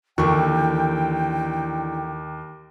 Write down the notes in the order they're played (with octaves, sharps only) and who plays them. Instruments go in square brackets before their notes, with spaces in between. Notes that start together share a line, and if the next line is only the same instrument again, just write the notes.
[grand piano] D#2 A#4 C#6 [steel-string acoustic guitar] D3 E3 [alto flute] G5